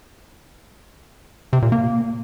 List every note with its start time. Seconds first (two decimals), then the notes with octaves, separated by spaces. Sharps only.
1.53 C3
1.62 A#2
1.72 A#3